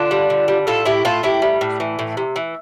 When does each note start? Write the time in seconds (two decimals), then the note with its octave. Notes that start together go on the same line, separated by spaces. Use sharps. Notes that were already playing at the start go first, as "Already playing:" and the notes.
Already playing: D3 D4 F4
0.11 G3
0.30 D3
0.48 G3
0.67 A2 F4 A4
0.85 A2 E4 G4
1.05 A2 F4 A4
1.23 A2 E4 G4
1.42 G3
1.61 A2
1.80 E3
1.99 A2
2.17 C3
2.36 E3